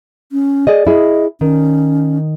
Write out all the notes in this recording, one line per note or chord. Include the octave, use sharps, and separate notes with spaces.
C#4
G#4 D5 D#5
E4 G#4 D#5
D#3 C#4